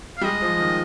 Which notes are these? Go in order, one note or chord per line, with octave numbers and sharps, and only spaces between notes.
F5
G3
G#3 D#5
F3
D#3